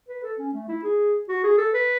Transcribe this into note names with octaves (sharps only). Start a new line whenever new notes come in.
B4
A4
C#4
A3
E4
G#4
F#4
G#4
A4
B4